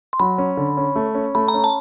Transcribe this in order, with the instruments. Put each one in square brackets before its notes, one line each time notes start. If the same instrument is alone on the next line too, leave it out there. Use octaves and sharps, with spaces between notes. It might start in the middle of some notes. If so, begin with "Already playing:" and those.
[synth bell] C6
[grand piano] F#3 [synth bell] B5
[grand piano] C#4
D3
C#4
A3
C#4
[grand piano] A3 [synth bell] B5
[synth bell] A#5
[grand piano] C#4
[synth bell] A5